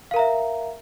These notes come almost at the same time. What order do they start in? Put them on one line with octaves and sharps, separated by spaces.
F5 A#4 A#5 E5